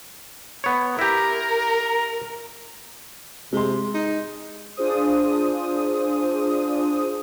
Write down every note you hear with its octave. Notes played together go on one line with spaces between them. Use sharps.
B3 C#5
E4 G4 A#4 A#5
C3 G#3 C6
D#4
D4 F4 G#4 C5 D#6